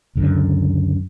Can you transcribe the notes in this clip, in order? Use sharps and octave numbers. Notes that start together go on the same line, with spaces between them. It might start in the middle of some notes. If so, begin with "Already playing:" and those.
C#2 F#2 D3